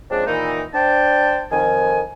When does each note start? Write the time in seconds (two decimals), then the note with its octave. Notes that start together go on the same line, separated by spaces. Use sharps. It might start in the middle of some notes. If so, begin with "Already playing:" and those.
0.11 C#3 F3 G#3 C4 D4
0.26 A#2 D#3 E3 D#4
0.74 D4 C5 G5 A5
1.51 F2 D#3 G#5